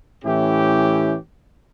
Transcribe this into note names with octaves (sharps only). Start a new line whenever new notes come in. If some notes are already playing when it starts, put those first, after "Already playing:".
A2 E3 C#4 E4 G4